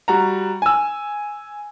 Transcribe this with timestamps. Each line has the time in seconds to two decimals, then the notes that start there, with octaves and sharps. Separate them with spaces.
0.08 G3 F#4 A#5
0.62 G#5 E6